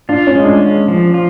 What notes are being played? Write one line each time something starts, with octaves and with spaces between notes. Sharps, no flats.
D4 F4
C#4
G#3
D4
C#4
F3
F4